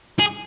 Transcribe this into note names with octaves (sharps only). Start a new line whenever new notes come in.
G#4